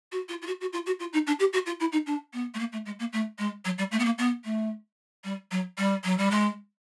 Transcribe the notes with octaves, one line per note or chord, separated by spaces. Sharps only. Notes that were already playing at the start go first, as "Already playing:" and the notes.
F#4
F4
F4
F#4
F#4
F4
F#4
F4
D#4
D4
G4
F#4
F4
E4
D#4
D4
B3
A3
A#3
A3
G#3
A#3
A3
G#3
F#3
G3
A3
B3
A#3
B3
A3
G3
F#3
G3
F#3
G3
G#3